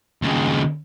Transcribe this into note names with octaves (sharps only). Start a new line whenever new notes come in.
D#2 C#3